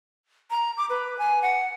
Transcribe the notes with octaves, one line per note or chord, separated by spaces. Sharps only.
A#5
D6
B4
G#5
F#5